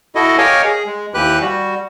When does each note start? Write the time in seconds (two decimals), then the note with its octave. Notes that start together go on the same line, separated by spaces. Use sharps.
0.15 E4 F#4 A4 D#5
0.38 G4 A#4 C#5 D#5 F5 G#5
0.65 G#4
0.86 G#3
1.14 D#2 E3 G4 B4 F#6
1.41 G3 F#4